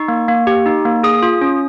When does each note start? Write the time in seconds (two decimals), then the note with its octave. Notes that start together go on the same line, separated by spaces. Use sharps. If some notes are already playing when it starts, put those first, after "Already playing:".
Already playing: D#4 C#6
0.08 A#3
0.28 A#3
0.47 G4
0.66 D#4
0.85 A#3
1.03 G#4 D#6
1.23 F4
1.41 C#4